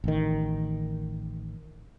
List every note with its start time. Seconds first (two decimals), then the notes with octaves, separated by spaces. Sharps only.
0.04 A1 D#3